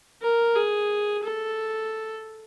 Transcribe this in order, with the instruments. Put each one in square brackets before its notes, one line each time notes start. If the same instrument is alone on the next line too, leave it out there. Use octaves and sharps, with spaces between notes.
[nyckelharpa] A#4
G#4
A4